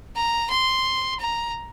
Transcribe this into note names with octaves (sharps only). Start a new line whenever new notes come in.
A#5
C6
A#5